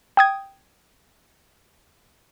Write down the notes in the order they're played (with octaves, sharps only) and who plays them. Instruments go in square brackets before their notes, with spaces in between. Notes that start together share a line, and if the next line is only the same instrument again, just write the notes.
[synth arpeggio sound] G5 D#6 G#6